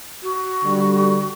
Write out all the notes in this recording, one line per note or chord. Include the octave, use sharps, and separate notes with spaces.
F#4
D3 G3